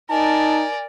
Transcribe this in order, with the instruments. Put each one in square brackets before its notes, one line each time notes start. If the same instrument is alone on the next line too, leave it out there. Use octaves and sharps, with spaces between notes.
[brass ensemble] D#4 [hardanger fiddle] A#4 D5 [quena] G#5 [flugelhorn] A5